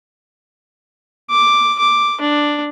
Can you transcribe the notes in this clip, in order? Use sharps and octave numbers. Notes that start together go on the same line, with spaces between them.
D6
D6
D4